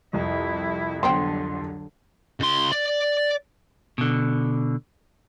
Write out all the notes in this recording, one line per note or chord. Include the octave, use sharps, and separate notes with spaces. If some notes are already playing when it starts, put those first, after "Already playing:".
C2 F2 E4
D3 F#3 B3 C5 G5 C6
C#2 C6
D5
B2 D3